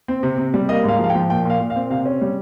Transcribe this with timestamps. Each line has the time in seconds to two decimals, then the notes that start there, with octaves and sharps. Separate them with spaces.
0.08 C4
0.23 C3
0.38 C3
0.54 G3
0.69 A#3 D#5
0.84 G#2 F5
0.99 F3 F5
1.10 G5
1.15 F3
1.30 A#2 G5
1.45 A#2 F5
1.60 A#2
1.70 F5
1.76 C4
1.90 C3 F5
2.06 C#4
2.22 G3